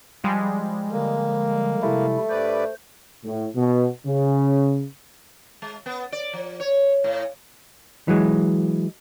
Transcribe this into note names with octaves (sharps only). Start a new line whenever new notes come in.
F3 G3 G#3
D3 A#3
C3 A3 E4
G2 B4 C5 D5
A2
B2
C#3
G#3
B3
D5
F3
C#5
A2
E3 F#3 G#3